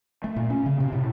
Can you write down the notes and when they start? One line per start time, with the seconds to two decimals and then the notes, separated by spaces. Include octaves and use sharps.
0.24 A3
0.36 A#2
0.50 C#4
0.66 C#3
0.80 C3
0.92 A2